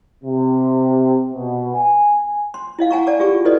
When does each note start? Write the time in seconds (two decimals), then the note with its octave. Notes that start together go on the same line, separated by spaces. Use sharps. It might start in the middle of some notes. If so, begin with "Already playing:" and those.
0.24 C3
1.33 B2
1.74 G#5
2.54 C6
2.79 E4 D#5 F5
2.91 F#5 G#5 A#5 C#6
3.07 D5 A5 D6
3.19 F4 G4 G#4 C#6 D6
3.45 E4 F#4 A4 B4 D5 D#5